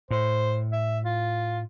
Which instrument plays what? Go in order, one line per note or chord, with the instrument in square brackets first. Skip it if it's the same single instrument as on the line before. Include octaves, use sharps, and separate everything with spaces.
[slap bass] A2 [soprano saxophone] C5
[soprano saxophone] E5
F4